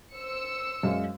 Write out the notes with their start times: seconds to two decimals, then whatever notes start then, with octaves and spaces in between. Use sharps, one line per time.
0.15 C5 E6 C#7
0.83 F#2 G#3 F5